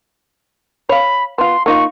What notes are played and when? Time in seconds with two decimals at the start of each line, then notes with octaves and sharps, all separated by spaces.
0.89 C#5 F5 B5
1.38 B3 F4 C6
1.66 A#3 D#4 F4 C#6